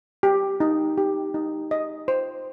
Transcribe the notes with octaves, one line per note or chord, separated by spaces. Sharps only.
G4
D#4
G4
D#4
D#5
C5